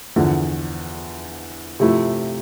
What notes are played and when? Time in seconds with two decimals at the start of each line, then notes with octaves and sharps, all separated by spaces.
0.16 E2 D3 F3
1.80 C3 F3 A3 E4